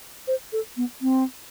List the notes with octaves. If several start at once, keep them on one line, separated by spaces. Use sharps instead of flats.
C5
A4
B3
C4